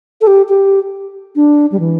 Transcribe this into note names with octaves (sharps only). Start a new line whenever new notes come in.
A4
G4
G4
D4
G3
E3